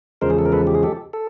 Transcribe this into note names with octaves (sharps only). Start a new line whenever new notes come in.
E2 C#3 F3 G#3 A#4 C5
G#4
A4
A#4
A4 B4
G4
G#4
G4 A4
A4